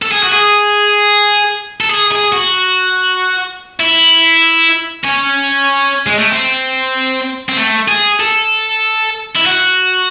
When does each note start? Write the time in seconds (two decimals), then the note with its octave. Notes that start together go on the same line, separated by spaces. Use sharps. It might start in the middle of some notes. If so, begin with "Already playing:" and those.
0.02 A4
0.12 G#4
0.23 F#4
0.33 G#4
1.80 A4
1.90 G#4
2.12 G#4
2.32 F#4
3.80 E4
5.05 C#4
6.07 G#3
6.19 A3
6.32 C4
7.49 C4
7.57 A3
7.88 G#4
8.20 A4
9.36 E4
9.46 F#4